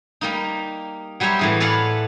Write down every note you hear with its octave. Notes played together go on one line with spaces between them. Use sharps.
G3 A#3 D#4
F#3 G3 G4 C5 C#5 E5
A2 E3 G#4
A4 B4 C#5 D5 F5 F#5